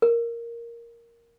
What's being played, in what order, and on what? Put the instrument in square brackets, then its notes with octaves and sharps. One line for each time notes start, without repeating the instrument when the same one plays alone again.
[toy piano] A#4